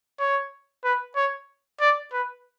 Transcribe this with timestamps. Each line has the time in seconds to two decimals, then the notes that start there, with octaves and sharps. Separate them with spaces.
0.20 C#5
0.84 B4
1.16 C#5
1.80 D5
2.13 B4